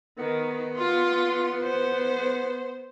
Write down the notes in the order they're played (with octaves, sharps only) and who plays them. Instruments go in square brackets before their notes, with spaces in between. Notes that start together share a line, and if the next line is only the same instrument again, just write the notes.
[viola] D#3 [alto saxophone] B3
[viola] F4 C6
C5